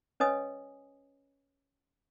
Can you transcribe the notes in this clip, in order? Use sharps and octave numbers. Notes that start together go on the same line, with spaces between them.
C#4 B4 C#5 D#5 G#5 D#6